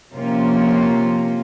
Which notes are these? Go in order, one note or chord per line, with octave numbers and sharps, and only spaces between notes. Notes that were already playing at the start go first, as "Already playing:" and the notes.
C3 F3 A#3 C#4 F4